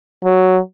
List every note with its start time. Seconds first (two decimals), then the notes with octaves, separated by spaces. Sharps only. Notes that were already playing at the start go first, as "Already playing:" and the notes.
0.24 F#3